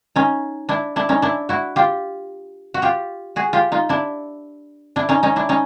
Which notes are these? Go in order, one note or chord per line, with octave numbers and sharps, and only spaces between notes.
C#4 D#4
D4 E4
D4 E4
C#4 D#4
D4 E4
E4 F#4
F4 G4
F#4
F4 G4
F#4 G#4
F4 G4
D#4 F4
D4 E4
D4 E4
C#4 D#4
C#4 D#4
D4 E4
C#4 D#4